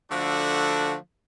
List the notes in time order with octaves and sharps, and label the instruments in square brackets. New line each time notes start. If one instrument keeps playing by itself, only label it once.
[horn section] D3 F3 A3 D4 F#4